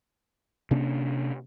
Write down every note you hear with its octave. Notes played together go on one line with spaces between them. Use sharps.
C3 A#3 C#4 D4